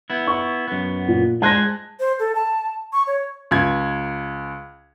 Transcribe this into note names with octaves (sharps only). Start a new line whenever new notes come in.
B3 E4
C#6
F#2 B3
A#2
G#3 C5 G#5 A5 F#6 A#6
C5
A4
A5
C#6
C#5
C#2 G#6